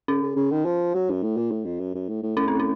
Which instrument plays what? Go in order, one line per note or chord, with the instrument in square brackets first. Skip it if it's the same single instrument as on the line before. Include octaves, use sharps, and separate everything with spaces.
[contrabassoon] C#3 [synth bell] C#4
[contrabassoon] C#3
C#3
D#3
F3
F#3
F#2
A2
A#2
A2
F2
F#2
F#2
A2
A2
[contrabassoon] A2 [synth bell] C#4
[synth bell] C4
C#4